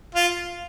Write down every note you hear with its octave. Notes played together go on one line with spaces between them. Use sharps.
F4